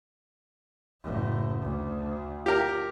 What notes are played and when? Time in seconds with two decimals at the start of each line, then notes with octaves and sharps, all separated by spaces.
1.03 F#1 A2
1.61 D2
2.46 G4 A#4